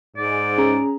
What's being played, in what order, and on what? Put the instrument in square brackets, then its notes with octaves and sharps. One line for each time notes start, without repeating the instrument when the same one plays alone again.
[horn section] G#2 [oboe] D5
[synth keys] C#4 G#4 A#5